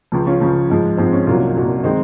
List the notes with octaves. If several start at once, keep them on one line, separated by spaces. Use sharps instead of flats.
C#2 C#3 F3
C#4 F4
C#2 C#3 F3
G#2 F3 G#3
G#2 F3 G#3 C4
C#4
C2 A#2 F#3 C#4 F4
C2 A#2 F#3
D#3 G#3 C4 D#4